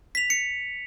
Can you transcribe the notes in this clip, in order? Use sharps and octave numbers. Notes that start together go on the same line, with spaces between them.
B6 F7
C#7